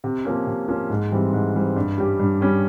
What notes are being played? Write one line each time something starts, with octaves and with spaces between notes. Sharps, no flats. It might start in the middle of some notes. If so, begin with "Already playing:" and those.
C3
F3 A#3 C#4
C3
F3 A#3 C#4
G#2
E3 G3 C4
G#2
E3 G3 C4
G2
G3 C#4 G4
G2
G3 C#4 G4